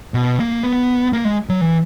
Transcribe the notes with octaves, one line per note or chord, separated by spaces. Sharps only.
B2
A#3
B3
A#3
G#3
F#3
E3